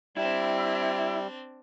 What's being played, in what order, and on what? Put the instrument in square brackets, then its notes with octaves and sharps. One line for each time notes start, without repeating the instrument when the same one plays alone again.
[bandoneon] G3 [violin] C4 D4 [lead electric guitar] E4